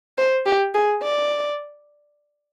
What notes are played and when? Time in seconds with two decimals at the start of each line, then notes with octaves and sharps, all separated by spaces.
0.18 C5
0.46 G4
0.74 G#4
1.02 D5